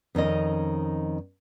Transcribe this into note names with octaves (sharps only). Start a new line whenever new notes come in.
F2 D#3 C#4 D#5